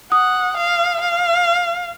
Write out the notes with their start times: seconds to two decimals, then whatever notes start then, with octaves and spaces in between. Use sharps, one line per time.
0.12 F#5 D#6
0.57 F5
1.01 F5